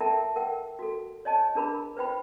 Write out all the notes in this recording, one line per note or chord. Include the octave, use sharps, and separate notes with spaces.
A4 A#4 E5 G5 A5 A#5
A#4 F#5 G5
F#4 A4
C#5 D#5 G#5 A5
D4 G#4 A#4 A#5 B5
B4 C5 G5 B5